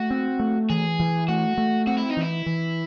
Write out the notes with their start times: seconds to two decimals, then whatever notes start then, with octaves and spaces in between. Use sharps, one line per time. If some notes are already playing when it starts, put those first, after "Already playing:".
Already playing: A3 F#4
0.11 C4
0.40 A3
0.69 E3 G#4
0.99 E3
1.28 A3 F#4
1.58 A3
1.87 C4 F#4
1.98 E4
2.10 D#4
2.17 E3 E4
2.46 E3